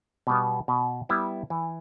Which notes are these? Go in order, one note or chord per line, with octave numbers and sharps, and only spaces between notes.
B2 G3 B3
B2
G3 B3 E4
E3